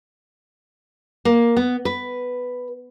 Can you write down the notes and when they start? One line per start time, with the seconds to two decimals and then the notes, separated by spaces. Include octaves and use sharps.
1.25 A#3
1.57 B3
1.85 B4